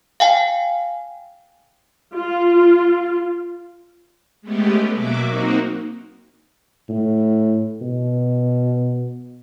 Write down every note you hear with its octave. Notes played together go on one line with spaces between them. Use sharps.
F5 G5 G#5
F4
G#3 A3 B3 C#4 G4
B2 F#3 A#3 F#4 E5 D6
A#3 C4 D#4 F#4
A2
B2